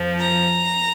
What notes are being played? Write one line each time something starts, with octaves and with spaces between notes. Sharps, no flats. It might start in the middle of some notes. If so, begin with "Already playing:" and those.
Already playing: F2 F3
A#5